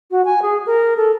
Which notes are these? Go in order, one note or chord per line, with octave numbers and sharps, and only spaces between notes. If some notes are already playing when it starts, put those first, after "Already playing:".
F#4
G#5
G#4
A#4
A4